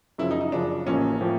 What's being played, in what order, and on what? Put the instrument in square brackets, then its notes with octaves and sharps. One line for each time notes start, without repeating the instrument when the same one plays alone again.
[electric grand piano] F#2 C#3 F3 [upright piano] E4
[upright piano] D#4
D#4
[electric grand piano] F#2 C#3 F3 [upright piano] D4
[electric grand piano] A1 A2 F3 A#3 [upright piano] C#4
[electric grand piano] A2 F3 A#3